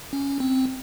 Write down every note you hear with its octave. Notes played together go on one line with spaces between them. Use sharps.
C#4
C4